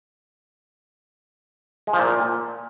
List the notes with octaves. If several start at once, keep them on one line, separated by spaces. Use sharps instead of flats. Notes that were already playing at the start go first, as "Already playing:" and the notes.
G#3
F3
A#2